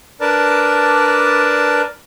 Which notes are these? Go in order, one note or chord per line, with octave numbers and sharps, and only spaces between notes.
D4 A#4 B4 D5 A5